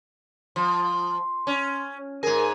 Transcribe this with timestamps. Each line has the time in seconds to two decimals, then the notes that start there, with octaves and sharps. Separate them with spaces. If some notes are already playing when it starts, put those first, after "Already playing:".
0.56 F3 C6
1.47 C#4
2.23 G#2 G#4 A#4